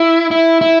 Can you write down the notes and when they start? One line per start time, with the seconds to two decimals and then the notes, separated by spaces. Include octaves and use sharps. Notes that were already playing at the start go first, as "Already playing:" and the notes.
Already playing: E4
0.31 E4
0.61 E4